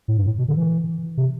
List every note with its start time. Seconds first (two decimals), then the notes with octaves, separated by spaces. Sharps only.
0.08 A2
0.18 G2
0.26 A2
0.38 B2
0.48 D3
0.57 E3
1.17 C3